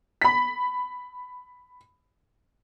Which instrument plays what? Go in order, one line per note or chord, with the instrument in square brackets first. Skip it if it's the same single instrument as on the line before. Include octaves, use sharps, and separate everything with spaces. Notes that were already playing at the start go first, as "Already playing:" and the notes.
[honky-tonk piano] B5 B6